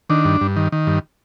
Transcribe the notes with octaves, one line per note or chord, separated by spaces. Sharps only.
D#3 D4
G2
G2
D#3
D#3
G2